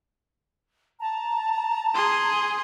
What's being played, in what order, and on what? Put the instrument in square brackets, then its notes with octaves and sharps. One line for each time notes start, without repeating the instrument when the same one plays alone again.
[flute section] A5 A#5
[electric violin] G#4 C6